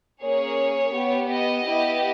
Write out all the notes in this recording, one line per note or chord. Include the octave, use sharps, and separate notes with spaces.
A#3 C#4 G#4 C#5
B3 G4
D#5
B3 E4 G4